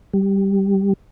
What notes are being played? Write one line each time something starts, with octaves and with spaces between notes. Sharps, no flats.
G3